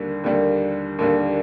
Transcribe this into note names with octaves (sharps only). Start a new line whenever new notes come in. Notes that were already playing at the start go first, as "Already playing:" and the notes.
Already playing: D#2 D3 G3 A#3
D#2 D3 G3 A#3
D#2 D3 G3 A#3